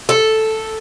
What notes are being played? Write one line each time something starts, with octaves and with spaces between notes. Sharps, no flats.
A4